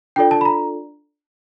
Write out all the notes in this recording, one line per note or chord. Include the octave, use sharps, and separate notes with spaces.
D4 F4 A4 D5 G5
A5
B5
A#5